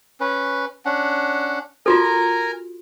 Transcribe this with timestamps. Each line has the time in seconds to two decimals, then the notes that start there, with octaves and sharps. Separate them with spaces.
0.20 C#4 B4
0.85 C#4 D4 F#5
1.86 F4 F#4 A4 A#4 G#5 A#5